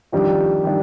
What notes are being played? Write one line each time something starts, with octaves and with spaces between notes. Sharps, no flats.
F2 D#3 G3 D4
D#3 G3 D4